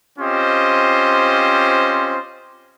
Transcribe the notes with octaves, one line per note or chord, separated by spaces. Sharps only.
C4 C#4 F4 G4 C5 D#5